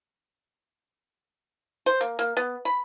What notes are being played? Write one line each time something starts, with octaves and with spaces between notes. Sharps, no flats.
C5
A#3
A#3
B3
B5